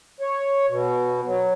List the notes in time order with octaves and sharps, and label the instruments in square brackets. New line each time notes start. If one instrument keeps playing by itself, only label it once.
[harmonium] C#5
B2
F#3